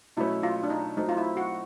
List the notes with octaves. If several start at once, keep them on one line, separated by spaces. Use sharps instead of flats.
B2 F#3 A3 C#4 E4
F4
D4
D#4
F#3 A3 C4 D#4
F4
E4
F#4